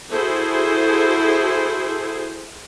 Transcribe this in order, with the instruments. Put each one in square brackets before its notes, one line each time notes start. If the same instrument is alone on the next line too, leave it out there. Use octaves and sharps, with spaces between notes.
[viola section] E4 F#4 G#4 A4 C5